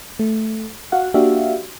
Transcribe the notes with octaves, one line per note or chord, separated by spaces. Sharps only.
A3
F#4 F5 F#5
A#3 D4 F#4 G4 E5 F5